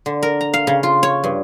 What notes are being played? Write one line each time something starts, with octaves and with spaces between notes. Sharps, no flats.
D3
A#4
A#5
F5
C#3
F4
C#5
G2